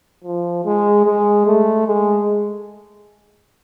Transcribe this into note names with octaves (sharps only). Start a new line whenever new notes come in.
F3
G#3
G#3
A3
G#3